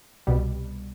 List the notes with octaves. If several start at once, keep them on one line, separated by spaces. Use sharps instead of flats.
C2 B2 G3